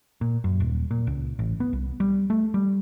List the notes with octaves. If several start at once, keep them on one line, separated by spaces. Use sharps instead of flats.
A#2
F#2
D#1
A#2
C#2
A1
B3
C2
G3
A3
G3